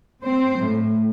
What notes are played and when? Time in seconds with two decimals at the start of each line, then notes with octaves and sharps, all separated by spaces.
0.23 C4 C5
0.60 A2